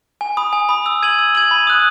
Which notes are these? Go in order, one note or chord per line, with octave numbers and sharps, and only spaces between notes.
G#5
B5 D#6
G#5
B5 D#6
E6
G#6 D#7 F#7
E6
G#6 D#7 F#7
B5
D#6 F#6